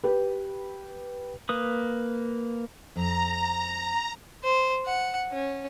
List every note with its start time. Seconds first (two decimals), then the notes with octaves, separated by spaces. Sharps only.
0.04 G4 B4
1.49 A#3 B4 D#6
2.96 F2 A#5
4.44 C5
4.86 F#5
5.32 C#4